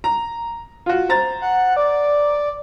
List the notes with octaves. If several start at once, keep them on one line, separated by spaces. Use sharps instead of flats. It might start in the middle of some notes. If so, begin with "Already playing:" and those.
A#5
F4 F#4
C5 A#5 A6
F#5
D5